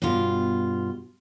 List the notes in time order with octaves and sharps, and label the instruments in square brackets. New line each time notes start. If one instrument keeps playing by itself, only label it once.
[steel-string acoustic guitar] G2 B2 F4